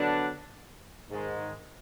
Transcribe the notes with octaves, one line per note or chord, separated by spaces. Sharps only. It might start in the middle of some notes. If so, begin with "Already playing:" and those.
Already playing: D3 F#3 B3 D4
G#2 D#3 G#3